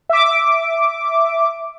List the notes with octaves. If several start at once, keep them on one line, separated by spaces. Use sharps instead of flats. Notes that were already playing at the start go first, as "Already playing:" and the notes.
E5 D6